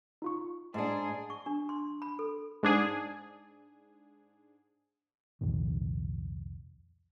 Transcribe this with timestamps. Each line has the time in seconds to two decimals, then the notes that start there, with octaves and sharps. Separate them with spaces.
0.22 D#4 F4 C#6
0.74 G#2 D4 G#4
1.30 C#6
1.46 D4
1.69 C6
2.02 B5
2.19 A4
2.63 G#2 D4 G#4
5.41 C2 F2 A#2 D#3